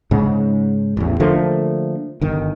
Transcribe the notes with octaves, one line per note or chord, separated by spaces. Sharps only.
G#2 C#3
A1 E2
D3 F3 A3 A#3
G1 D#3